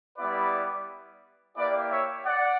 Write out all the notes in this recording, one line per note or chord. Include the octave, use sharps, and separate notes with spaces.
G3 B3 E4 G4 B4 D5
A#3 E4 G4 B4 D5
C#5 E5
D5 F#5